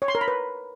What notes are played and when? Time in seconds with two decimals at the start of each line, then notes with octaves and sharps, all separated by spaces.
0.02 C#5
0.08 C6
0.15 A#4
0.21 B5
0.28 B4